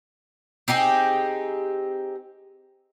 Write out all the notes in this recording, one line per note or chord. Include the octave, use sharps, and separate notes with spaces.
C4 D#4 G4 G#4